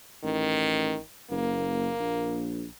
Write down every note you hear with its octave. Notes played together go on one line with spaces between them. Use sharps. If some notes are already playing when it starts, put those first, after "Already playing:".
A1 D#3
F#1 A#3
A#1